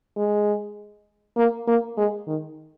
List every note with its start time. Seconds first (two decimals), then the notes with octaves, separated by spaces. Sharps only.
0.17 G#3
1.37 A#3
1.68 A#3
1.97 G#3
2.27 D#3